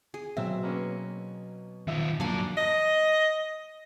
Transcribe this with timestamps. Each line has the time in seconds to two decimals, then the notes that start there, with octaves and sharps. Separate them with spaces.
0.14 G#4
0.37 B2 F#3 C4 E5 E6
0.63 A#3 B3 C#4
1.88 D#3 F4 E5
2.20 A#2 F#3 D4 A#4 F5 G#5
2.57 D#5